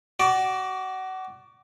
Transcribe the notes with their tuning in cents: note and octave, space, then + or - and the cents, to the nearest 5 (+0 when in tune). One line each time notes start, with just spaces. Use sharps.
F#4 +25 D5 +0